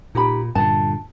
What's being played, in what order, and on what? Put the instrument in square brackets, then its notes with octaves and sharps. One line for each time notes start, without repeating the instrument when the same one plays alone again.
[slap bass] A#2 [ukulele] D#4 G4 B5
[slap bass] G2 A#2 D3 [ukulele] A5